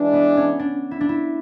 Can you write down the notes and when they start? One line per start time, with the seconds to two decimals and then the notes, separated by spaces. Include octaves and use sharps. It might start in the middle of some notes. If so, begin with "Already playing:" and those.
Already playing: E3 G#3 D4
0.13 B3
0.37 C#4
0.59 D4
0.91 E4
1.01 D4
1.09 E4